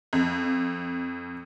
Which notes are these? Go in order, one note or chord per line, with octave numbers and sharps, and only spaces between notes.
F2